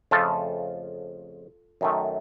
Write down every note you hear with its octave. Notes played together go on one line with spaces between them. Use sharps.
F2 C#3 F3 A3 F4 A4
F#2 D#3 A3